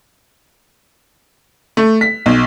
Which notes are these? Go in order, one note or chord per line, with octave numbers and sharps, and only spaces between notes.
A3
B6
B1